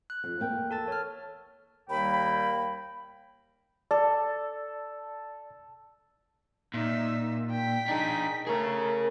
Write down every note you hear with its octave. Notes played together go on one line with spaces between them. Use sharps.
F#6
F2
E2 A#3 G5
A4 A5 A6
C#5 F6
D#2 G3 A#3 G5 B5
A4 D5
A#2 D#4 E5
G5 B6
D4 D#4 G#4
A3 G#4 A#4 C#5